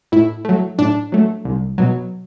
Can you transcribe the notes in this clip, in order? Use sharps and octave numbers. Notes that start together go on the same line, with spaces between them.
A2 E4
F#3 A3
A2 D4
F#3 A3
C2
B2 F#3